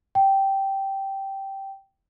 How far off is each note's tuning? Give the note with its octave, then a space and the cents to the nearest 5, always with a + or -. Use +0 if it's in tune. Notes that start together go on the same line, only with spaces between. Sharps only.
G5 -10